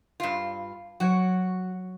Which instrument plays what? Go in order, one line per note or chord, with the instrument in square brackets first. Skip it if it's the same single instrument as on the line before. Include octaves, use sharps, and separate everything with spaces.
[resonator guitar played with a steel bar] G2 F4
[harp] F#3 C#5 D7 [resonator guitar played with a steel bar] F#4